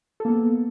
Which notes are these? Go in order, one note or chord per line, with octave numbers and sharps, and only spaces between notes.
A#3 B3 A4